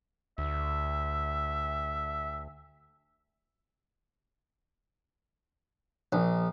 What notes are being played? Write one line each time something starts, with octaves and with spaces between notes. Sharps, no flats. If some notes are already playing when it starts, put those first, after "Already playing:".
D2 E5
A#1